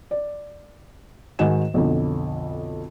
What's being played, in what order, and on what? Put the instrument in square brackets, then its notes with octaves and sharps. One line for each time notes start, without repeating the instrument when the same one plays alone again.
[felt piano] D5
G#2 D#3 F#4 F#5 G#5 E7
B1 F2 D3